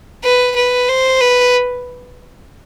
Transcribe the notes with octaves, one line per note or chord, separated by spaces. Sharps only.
B4
B4
C5
B4